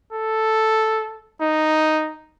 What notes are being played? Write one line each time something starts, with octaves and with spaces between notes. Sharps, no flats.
A4
D#4